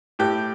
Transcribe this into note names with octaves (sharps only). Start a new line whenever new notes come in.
A2 G4